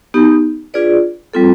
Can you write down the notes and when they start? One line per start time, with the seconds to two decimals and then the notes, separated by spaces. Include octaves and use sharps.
0.14 B3 D#4 G4
0.74 D4 F4 G#4 B4 D5
1.33 G3 C4 F4 A4